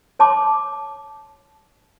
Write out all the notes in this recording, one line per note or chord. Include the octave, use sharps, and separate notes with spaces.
C#5 A5 C6 D6